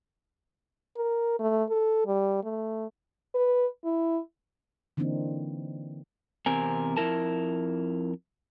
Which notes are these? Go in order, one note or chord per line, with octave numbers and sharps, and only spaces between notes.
A#4
A3
A4
G3
A3
B4
E4
D3 E3 A#3 C4 D4 D#4
E2 C3 C4 A#4 G#5
F2 D#3 E4 A#4 A5